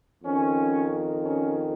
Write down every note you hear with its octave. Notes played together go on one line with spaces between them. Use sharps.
F2 D#3 C#4
C#4